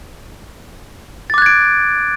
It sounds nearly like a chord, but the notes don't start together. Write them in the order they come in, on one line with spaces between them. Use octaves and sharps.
A6 D6 F#6 G#6 D7